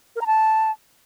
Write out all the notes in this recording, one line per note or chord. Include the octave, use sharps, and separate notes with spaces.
A#4
A#5
A5